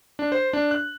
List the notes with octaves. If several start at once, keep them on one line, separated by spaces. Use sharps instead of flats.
D4
C5
D4
F#6